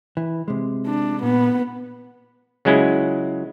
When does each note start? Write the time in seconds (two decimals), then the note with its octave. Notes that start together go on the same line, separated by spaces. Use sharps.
0.17 E3
0.48 C3 G#3
0.87 D4
1.23 A#2 B3
2.65 C#3 F#3 G#3 C#4 E4 F4